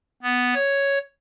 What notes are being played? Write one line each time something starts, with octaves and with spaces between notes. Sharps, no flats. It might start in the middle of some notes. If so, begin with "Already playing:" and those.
B3
C#5